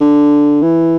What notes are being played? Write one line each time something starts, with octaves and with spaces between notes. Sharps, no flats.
D3
E3